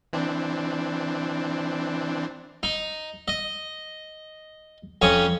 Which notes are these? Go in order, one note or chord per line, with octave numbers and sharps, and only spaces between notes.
E3 C4 D4
D#4
D#5
F2 C#4 C#5 D#6